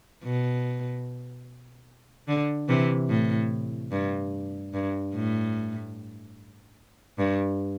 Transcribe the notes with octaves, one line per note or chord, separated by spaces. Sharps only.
B2
D3
C3 E3
A2
G2
G2
A2
G2